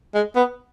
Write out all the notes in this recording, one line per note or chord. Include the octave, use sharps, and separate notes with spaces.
G#3
B3